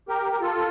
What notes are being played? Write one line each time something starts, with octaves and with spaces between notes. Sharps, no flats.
G4 A#4
A#4
F4 A4